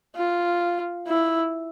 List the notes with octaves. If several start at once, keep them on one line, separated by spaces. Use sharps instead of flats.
F4
E4